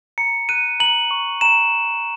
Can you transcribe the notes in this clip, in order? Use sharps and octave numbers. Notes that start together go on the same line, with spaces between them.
A#5 C#7
F#6 D#7
A#5 F#7
C#6
A#5 E7